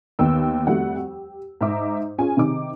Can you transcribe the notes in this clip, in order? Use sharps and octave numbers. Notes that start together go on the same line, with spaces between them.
D#2 D#3 B3 G5 E6
F2 G3 A3 F#4 F#5
G4
G#2 D#4 E5 A#5 D6
C#4 F4 G#4 G#5
C3 D#3 D#4 D6